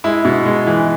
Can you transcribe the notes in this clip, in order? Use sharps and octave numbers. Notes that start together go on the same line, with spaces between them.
G#3 E4
B2
G#3
E3